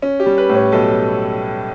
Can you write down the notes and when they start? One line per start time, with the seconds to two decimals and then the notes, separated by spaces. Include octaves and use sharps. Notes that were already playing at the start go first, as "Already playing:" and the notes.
0.02 C#4
0.20 G4
0.26 G3
0.38 B4
0.49 A2
0.55 C#5
0.72 B1 A4